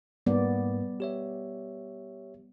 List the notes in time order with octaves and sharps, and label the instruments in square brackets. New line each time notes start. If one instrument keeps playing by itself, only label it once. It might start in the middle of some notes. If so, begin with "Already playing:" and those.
[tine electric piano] G#2 A#3 [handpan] G3 B3 D5
[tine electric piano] G4 C#5 E5